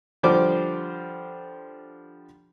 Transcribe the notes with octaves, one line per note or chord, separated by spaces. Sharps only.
D3 F3 G3 C5 D5 D6